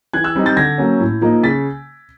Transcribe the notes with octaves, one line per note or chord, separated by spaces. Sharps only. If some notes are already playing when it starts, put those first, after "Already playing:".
E3 F#6 G#6
E6 F#6
G3 C4 D#4
G6 A6
D3 G#6 A#6
F#3 A#3 C#4
A2
F3 A#3 D#4
C#3 A6 B6